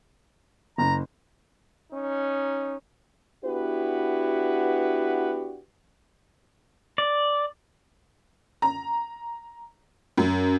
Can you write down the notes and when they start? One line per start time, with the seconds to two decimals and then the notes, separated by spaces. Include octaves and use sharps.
0.78 F#1 A#5
1.91 C#4 D#4
3.45 B3 D4 E4 F#4 G4 B4
6.98 D5
8.62 A#5
10.17 F#2